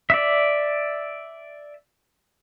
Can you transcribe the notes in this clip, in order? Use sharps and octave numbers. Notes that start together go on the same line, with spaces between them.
D5 E5